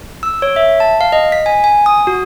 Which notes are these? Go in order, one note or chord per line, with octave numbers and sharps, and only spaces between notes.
E6
C#5
E5
A5
F5
D#5
B6
G#5
G#5
D#6
F#4